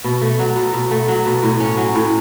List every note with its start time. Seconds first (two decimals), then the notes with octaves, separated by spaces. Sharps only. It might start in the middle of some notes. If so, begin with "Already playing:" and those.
0.04 B2
0.21 A3
0.39 F#3
0.56 B2
0.74 B2
0.91 A3
1.08 F#3
1.26 B2
1.43 A2
1.60 C#4
1.77 F#3
1.95 A2